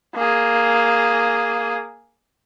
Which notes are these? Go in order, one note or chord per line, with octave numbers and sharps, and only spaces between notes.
A#3 G#4